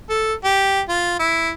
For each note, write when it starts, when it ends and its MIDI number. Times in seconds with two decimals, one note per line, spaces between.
0.10 0.34 69
0.44 0.80 67
0.89 1.18 65
1.20 1.51 64